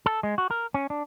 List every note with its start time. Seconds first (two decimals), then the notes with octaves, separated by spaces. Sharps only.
0.06 A4
0.23 G#3
0.38 F#4
0.51 A#4
0.74 C#4
0.90 D4